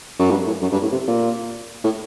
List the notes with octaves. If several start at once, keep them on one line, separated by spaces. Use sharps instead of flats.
F#2
G2
A2
F#2
G2
A2
C3
A#2
A2